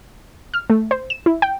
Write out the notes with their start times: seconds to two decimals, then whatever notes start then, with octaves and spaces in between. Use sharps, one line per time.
0.54 F6
0.70 A3
0.91 C5
1.10 E7
1.26 E4
1.42 G5